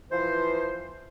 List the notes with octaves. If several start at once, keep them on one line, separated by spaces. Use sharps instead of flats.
E3 F3 C5